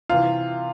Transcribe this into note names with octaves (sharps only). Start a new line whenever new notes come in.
C3 E3 F4